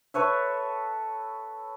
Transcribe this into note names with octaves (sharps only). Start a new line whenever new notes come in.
A4 B4 C#5 E5